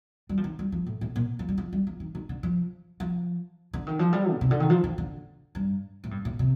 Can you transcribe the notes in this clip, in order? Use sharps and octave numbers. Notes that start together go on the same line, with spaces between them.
G3
F3
D#3
G3
F3
A2
A2
A#2
F3
G3
F3
G3
F3
D#3
D#3
D3
F3
F3
D3
D#3
F3
G3
A#2
C3
D3
D#3
F3
D#3
D3
G2
A2
G2
A2
C3